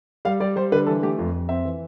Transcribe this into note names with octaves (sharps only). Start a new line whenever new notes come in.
G3 F5
G3 D5
G3 C5
D3 B4
E3 A4
A3 G4
F2 F4
F2
C4 E5
E3